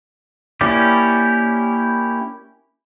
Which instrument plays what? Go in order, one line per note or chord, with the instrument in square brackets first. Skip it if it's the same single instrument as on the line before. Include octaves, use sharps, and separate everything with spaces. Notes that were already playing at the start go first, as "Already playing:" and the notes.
[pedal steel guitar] A#3 C#4 E4 G4 D5